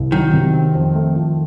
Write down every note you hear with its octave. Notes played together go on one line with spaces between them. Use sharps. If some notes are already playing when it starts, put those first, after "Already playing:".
Already playing: C2
D#3 F#3
C3
C4
F2
A3
F3